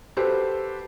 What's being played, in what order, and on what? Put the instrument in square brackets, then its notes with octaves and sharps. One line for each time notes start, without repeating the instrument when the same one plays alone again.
[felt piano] F#4 G4 A4 B4 C5